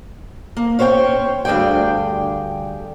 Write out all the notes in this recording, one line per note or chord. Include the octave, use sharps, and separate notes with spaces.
A#3
C#4 C5 C#5 F#5 G5
D2 G2 G#4 D5 G5